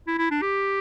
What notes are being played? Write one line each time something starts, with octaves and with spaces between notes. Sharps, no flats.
E4
E4
D4
G4